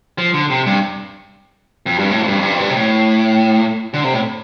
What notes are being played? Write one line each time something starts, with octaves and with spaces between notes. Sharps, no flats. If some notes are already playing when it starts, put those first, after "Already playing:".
F3
D3
C3
G2
F2
G2
A2
F2
G2
F2
G2
F2
G2
C3
A2
D3
C3
A2